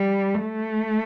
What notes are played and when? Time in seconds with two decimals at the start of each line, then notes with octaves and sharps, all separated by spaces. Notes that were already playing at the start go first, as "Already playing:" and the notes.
Already playing: G3
0.41 A3